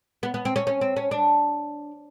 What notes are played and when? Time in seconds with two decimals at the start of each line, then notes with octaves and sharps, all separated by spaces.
0.23 B3
0.34 B3
0.45 C4
0.56 C#4
0.67 C#4
0.81 C4
0.96 C#4
1.11 D4